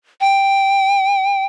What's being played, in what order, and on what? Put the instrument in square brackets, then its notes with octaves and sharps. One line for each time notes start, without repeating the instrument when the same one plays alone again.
[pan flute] G5